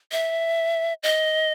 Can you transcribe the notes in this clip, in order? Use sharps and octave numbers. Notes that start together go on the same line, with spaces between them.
E5
D#5